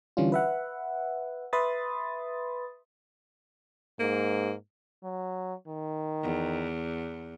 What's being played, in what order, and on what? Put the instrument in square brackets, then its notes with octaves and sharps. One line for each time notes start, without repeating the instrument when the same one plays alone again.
[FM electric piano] D3 E3 G3 C#4 D4 F4
B4 E5 F#5
B4 E5 B5 C6 D#6 A6
[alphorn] G#2 [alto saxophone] A#3
[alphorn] F#3
D#3
[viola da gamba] E2